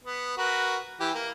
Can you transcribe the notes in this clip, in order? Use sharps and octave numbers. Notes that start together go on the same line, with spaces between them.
B3
F#4 A#4 B4
E3 G4
A#3